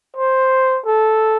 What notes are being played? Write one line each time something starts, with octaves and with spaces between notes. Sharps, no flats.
C5
A4